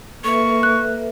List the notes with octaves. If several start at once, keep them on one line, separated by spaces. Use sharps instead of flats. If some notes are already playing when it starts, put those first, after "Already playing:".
A#3 A4 B4 E5 C#6
F#6